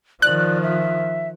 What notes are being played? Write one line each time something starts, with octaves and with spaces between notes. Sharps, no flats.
D#3 F3 D5 F#6
E5